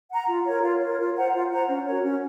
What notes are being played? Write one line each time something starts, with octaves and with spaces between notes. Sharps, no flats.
F#5 A#5
F4
A#4 C#5
F4
A#4 C#5
F4
C5 F#5 A#5
F4
C5 F#5 A#5
C#4
F#4 A#4 C#5
C#4